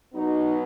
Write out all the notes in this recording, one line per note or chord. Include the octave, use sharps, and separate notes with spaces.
B2 F#3 B3 D#4